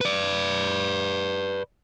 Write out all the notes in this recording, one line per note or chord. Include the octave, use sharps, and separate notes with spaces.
B4 D5